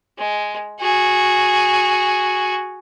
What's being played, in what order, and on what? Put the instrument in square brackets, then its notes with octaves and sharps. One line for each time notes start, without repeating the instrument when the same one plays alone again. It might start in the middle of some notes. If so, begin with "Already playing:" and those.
[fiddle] G#3
F#4 G#4